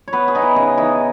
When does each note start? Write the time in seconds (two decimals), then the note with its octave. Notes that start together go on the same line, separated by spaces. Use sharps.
0.08 C#5
0.13 B3 B4
0.28 G#4
0.35 B3 D#4
0.42 E4
0.56 C#3 D#4
0.77 E3 D#4